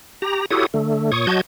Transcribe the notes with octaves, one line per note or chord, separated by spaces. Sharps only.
G4 A#5
E4 F#4 G4 A4 C#5 D#6
D3 A3
A#2 C#5 C#6 D#6
F#3 F#4 D#5 A5 G6 G#6